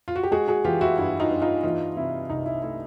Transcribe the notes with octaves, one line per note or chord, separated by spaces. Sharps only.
F4
F#4
G4
G#3 F#4 G#4
F#4 G#4
E3 F4 G4
E4 F#4
G2 E4
D#4 F4
G2
D#4 F4
E3 D#4 F4
C3 E4
C2 D#4
E4
A3 E4